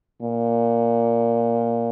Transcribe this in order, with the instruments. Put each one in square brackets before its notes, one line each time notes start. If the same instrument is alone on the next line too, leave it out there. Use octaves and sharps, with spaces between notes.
[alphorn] A#2